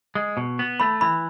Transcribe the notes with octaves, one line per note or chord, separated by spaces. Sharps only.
G#3
B2
B3
A3 B5
E3 B5